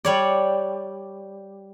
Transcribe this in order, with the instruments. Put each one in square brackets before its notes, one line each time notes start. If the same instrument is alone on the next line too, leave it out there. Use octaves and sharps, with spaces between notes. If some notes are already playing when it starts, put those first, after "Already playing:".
[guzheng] G3 C#5 D5